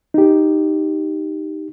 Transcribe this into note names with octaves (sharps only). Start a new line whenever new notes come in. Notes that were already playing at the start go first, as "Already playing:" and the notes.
D#4 G4